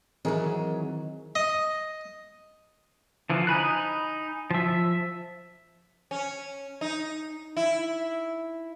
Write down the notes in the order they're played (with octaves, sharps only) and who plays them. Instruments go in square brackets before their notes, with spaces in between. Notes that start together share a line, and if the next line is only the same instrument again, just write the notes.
[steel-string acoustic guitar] D#3 E3 F#3 [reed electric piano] C4 G#4 A#4
[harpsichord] D#5
[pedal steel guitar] D3 E3 F3
D#4 G#5 B5 F#6
F3 E5
[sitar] C#4
D#4
E4